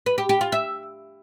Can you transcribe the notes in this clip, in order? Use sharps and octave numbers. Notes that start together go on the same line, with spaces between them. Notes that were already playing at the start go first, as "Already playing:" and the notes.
B4
G4
G4
F4
E5